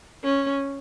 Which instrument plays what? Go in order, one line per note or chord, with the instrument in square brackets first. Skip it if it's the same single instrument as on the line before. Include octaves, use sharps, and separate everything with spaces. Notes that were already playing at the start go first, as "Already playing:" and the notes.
[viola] C#4